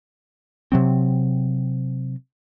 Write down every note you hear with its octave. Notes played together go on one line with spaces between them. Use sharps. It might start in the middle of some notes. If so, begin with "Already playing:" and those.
C3 F#3 C4